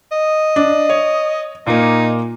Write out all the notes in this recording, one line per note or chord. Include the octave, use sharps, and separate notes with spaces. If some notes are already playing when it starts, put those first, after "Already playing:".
D#5
D4
C#5
A#2 A#3 D#4